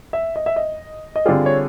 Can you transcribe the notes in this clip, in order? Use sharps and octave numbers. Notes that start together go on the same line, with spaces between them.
E5
D#5
E5
D#5
D#5
D3 G3 C4 F4 G#4 D5
C#5